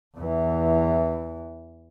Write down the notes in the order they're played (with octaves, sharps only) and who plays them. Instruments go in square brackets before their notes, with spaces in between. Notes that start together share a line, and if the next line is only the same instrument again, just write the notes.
[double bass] E2 E3